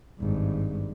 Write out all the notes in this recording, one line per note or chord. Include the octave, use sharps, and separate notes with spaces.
G#1 G2